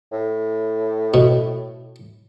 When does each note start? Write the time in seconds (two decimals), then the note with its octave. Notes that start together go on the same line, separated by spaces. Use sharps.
0.12 A2
1.14 B2